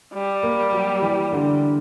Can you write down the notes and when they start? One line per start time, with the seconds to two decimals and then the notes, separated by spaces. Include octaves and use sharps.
0.14 G3
0.43 A#3
0.72 F#3
1.02 E3
1.33 D3